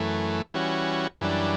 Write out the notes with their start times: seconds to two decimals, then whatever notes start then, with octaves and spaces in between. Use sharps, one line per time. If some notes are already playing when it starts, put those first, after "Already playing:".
Already playing: F#2 E3 A3
0.54 E3 G3 C#4 F#4
1.21 F#2 E3 G3 D4